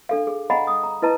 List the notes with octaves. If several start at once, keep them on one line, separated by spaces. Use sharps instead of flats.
D4 A4 F5
G#4
D#5 F5 F#5 G#5 A#5 B5
D#6
A#5
E4 B4 D#5 A5 A#5